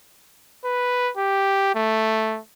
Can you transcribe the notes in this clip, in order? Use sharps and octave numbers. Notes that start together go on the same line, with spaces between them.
B4
G4
A3